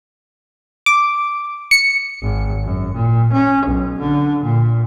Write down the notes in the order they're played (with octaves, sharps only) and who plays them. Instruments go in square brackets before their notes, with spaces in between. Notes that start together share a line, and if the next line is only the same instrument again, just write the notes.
[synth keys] D6
C#7
[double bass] G#1
F#2
A#2
C#4
B1
D3
A#2